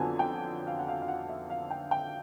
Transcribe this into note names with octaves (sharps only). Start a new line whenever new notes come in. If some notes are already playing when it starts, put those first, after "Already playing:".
Already playing: F2 D3 F#3 B3 G#5
G5
F5
F#5
F5
F5
F#5
E5
F5
G5
G5